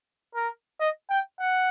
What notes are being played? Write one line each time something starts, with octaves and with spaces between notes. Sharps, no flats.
A#4
D#5
G5
F#5